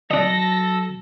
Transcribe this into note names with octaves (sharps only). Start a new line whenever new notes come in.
F#3 D4 A4 D#5 A#6